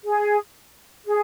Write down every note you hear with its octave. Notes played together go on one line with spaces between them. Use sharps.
G#4
G#4